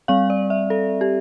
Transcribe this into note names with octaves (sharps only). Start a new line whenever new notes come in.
G3 C4 F5
D5
E5
A4
G4